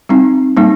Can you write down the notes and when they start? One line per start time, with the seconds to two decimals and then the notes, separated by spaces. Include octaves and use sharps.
0.09 G3 C4 D#4
0.57 G3 A#3 D#4